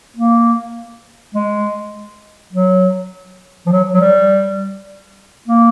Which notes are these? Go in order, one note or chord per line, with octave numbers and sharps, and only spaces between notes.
A#3
G#3
F#3
F3
F#3
F#3
G3
A#3